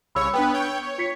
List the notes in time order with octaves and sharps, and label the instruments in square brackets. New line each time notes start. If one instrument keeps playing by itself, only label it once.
[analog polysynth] C2 C#3 C#5 [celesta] B5 E6
[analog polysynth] B3 B4 [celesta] D4 G5
[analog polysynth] C#5 G5 [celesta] C#6
[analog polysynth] C#5
[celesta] F4 B6 C#7